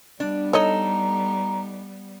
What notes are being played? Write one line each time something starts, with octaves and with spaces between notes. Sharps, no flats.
G3 B3 D4
D#4 A4 C#5 D#5 A#5